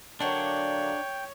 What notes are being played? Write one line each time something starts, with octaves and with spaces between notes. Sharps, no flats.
D3 F#3 A#3 D4 C#5 G5